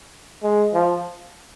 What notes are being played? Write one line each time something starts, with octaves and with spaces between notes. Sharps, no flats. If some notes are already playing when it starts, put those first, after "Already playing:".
G#3
F3